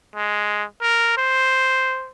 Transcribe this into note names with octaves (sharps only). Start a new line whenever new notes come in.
G#3
A#4
C5